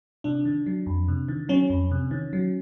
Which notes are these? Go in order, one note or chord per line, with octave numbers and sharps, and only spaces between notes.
C3 D4
D#3
F#3
F2
C3
D#3
F#3 C#4
F2
C3
D#3
F#3